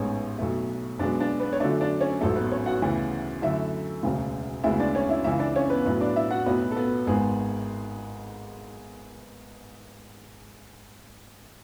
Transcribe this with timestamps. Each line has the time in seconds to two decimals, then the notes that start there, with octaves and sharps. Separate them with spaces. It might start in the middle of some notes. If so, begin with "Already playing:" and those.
Already playing: A1 G#2 G#3 B3 C#4 C#5
0.38 B1 B2 A3
0.99 B1 B2 G#3 B3 D4
1.20 D4
1.40 B3 B4
1.53 C#5
1.60 F#2 D3 F#3 A3 D4 D5
1.81 D4 D5
2.01 C#4 C#5
2.21 A1 G#2 F#3 A3 A4
2.36 B3 B4
2.52 C#4 C#5
2.66 F#4 F#5
2.82 D2 C#3 E3 B3
3.42 F#2 D3 A3 E4 E5
4.03 E1 D2 C#3
4.64 D2 C#3 G#3 B3 E4 E5
4.80 D4 D5
4.95 C#4 C#5
5.09 E4 E5
5.24 C#2 C#3 E3 E4 E5
5.39 D4 D5
5.56 C#4 C#5
5.70 B3 B4
5.85 B1 A2 F#3 B3 B4
6.01 D4 D5
6.16 E4 E5
6.30 F#4 F#5
6.46 B1 A2 F#3 B3 B4
6.71 A4
6.76 B3 B4
7.07 G#1 G#2 G#3 B3 G#4